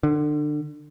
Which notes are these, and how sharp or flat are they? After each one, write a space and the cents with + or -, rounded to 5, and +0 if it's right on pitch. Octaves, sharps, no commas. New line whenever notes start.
D3 +30